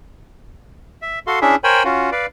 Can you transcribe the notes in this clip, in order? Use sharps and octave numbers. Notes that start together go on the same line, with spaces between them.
E5
F#4 A4 F5 C6
C#4 D4 E4 G#4 E5
A#4 C5 C#5 G5 G#5 B5
C#4 F4 F#4
B4 D5 F5